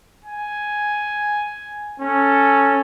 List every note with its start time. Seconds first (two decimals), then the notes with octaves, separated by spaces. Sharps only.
0.25 G#5
2.00 C#4 A4